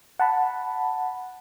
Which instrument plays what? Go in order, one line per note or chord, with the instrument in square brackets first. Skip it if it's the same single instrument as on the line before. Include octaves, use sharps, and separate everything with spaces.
[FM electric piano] F#5 A5 B5